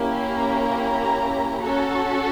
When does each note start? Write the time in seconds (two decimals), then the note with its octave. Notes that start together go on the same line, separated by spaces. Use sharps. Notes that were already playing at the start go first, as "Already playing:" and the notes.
Already playing: A#3 C#4 E4 G4
0.24 A#5
1.62 C#4 F#4 A4